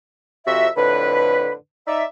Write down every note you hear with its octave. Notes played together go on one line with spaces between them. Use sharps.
F2 C3 F3 F#4 E5
F2 A2 D3 B4
D#4 D5 E5